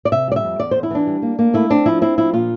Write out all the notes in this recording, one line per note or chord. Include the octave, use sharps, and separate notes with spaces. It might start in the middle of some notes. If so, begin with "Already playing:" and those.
D5
C3 E5
G3 D5
E5
F2
E2 D5
E2 C5
E4
E3 D4
G3
A#3
A#3
A3 E4
C4 D4
F3 E4
C4 E4
F3 E4
A#2 F4